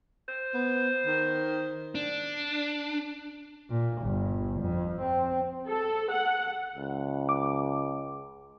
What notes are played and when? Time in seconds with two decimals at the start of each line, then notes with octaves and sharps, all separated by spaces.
0.29 C5
0.54 B3
1.07 D#3
1.95 D4
3.70 A#2
4.02 G1
4.60 F2
5.01 C4
5.68 A4
6.11 F#5
6.76 C#2
7.29 D6